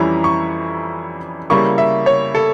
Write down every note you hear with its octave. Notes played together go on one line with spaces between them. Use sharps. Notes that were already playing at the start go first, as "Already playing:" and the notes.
Already playing: F2 E3 G3 C#4 E4 A#5
C#6
C#3 G3 A#3 E4 C#6
E5
C#5
A4